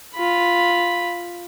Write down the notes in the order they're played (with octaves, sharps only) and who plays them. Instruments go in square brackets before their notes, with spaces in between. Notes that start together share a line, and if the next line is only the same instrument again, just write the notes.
[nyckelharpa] F4 B5